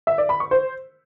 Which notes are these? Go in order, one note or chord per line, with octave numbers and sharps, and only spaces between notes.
E5
D5
B5
C#6
C5